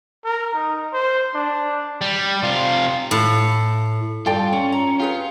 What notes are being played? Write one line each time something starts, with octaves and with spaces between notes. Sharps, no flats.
A#4
D#4
C5
D4
G3
C3 F4
A2
G2 F4 A4 D5 G5
C#4 C#5
A#5
F4 G4 G#4 B4